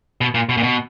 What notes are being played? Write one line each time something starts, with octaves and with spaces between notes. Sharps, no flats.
B2
A#2
B2
A#2
B2